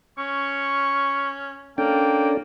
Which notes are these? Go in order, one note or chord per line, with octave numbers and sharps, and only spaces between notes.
C#4 C#6
A#3 C#4 D4 A4 G5